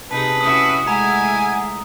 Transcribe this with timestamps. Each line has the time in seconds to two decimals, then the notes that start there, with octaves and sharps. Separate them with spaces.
0.11 C3 D#4 G#4 B4 A5
0.41 C#4 E4 F#4 D#6
0.87 G#3 A3 E4 F#5 G#5 A#5